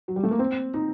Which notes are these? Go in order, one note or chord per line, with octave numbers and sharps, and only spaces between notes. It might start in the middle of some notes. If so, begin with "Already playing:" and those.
F#3
G3
A3
A#3
C4
D#4